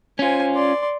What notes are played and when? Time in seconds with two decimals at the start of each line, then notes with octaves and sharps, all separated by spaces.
0.19 C#4 F4 C5 G#5
0.55 D5 C6